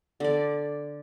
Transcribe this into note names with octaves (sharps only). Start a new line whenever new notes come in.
D3 D5